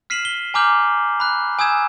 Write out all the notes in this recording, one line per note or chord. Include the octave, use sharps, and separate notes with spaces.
F6 B6 C7 D#7 E7 F#7
G7
G#5 A#5 D6 F6 G6 F#7
B5 F#6
G#5 D#6 E6 G6 G#6 E7